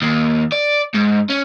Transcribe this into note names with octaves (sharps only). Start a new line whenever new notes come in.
D#2
D5
G#2
C#4